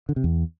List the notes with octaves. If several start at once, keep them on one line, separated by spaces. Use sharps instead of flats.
D3
C3
E2